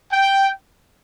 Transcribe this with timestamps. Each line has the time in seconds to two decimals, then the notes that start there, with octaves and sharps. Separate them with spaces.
0.12 G5